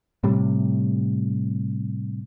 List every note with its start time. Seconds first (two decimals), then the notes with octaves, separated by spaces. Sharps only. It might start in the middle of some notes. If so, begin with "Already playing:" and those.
0.24 A2 C3 G3